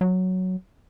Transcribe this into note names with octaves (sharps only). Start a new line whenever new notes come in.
F#3